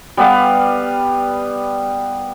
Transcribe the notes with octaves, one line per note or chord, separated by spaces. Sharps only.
G3 B3 B4 F5